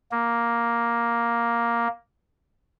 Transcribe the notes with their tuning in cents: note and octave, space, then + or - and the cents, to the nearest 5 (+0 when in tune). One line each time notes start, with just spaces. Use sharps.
A#3 +5